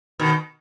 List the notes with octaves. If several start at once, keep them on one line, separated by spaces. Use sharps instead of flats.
B2 D#3